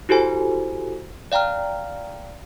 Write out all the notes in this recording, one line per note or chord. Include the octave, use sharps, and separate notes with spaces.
E4 F#4 G4 A4 C5 G#5
D5 F5 G5 A#5 F6